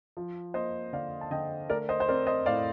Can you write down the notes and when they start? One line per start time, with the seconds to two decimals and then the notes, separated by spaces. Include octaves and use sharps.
0.17 F3
0.54 A#3 C5 D#5
0.92 D3 D5 F5
1.21 A5
1.31 D3 D#5 G5
1.69 A3 A#4 D5
1.89 C5 D#5
2.00 C5
2.08 C4 A#4 D5
2.27 C5 D#5
2.46 A2 D5 F5